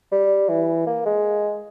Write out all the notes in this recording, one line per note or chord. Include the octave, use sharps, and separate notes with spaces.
G3
E3
A#3
G#3